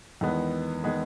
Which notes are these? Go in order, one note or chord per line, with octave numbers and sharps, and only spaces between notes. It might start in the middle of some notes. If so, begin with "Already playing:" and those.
E2 D#3 G#3 B3
D#3 G#3 B3